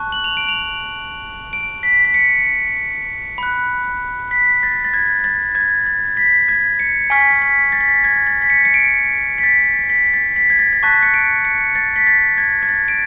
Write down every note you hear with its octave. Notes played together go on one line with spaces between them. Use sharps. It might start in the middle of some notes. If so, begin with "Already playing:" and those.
Already playing: A5 C#6 F#6
F#7
F7
D7
F7
D7
B6
B6
C#7
B5 F#6
B6
A6
A6
G#6
A6
G#6
A6
B6
G#6
C#7
G#5 C#6 F6 B6
B6
A6
B6
A6
G#6
A6
B6
C#7
C#7
D7
B6
A6
B6
A6
B6
G#6
A6
A6
A5 C#6 F#6 B6
C#7
D7
C#7
A6
B6
A6
G#6
G#6
A6
D7